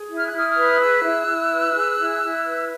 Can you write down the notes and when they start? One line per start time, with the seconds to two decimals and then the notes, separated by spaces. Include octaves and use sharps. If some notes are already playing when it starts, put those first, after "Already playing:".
Already playing: G#4
0.09 E4
0.16 F6
0.27 F#6
0.32 E4
0.37 D#6 F6
0.48 D#6 F6
0.56 B4
0.80 G#4 E6 F#6
1.03 E4
1.27 E4
1.51 B4
1.74 G#4
1.98 E4
2.22 E4
2.45 B4